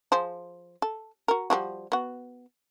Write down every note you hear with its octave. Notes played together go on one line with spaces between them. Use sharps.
F3 G#4 C5
A4
F#4 A#4
F3 G3 F#4
B3 F#4